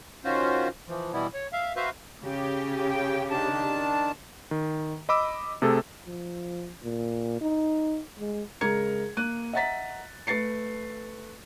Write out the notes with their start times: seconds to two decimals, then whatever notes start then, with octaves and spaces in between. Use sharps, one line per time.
0.24 D#3 C#4 F4 F#4 C5
0.88 E3 F3
1.13 B2 E3 G3 B3 E4
1.34 C#5
1.53 E5 F5
1.76 F#4 B4 C5 E5 F5
2.22 C#3 G4
2.90 G5
3.30 D#3 D4 A5
4.51 D#3
5.09 D#5 B5 D6 E6
5.62 C3 A3 G#4 A4
6.05 F3
6.83 A#2
7.41 D#4
8.19 G#3
8.61 C#3 G#3 A#4 A#5 G#6 C#7
9.17 A#3 F#6 D#7
9.53 D#5 E5 F#5 A#5 A6 B6
10.27 A3 B4 A6 C7 C#7